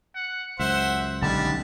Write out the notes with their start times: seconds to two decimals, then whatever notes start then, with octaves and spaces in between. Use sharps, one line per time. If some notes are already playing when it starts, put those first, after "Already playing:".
0.15 F#5
0.60 C#2 F#2 C5 E5 F#5
1.22 B1 D3 G3 G#3 A5